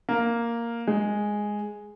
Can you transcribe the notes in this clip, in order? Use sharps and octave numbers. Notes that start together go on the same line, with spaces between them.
A#3
G#3